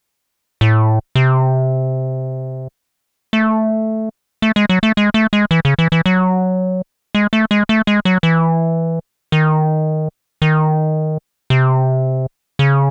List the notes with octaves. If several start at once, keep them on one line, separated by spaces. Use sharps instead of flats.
A2
C3
A3
A3
G#3
F#3
A3
G#3
A3
G#3
E3
C#3
E3
E3
F#3
G#3
A3
G#3
A3
G#3
F#3
E3
D#3
D#3
C3
C#3